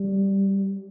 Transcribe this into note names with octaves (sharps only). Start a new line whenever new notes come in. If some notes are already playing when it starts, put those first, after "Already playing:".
Already playing: G3